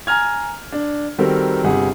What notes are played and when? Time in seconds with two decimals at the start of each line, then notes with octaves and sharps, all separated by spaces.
0.07 G#5 A#5 F6 G#6
0.72 D4
1.18 D#3 G3 C4 F#4 A4 A#4
1.64 G1 C3 G3 G#4 F#5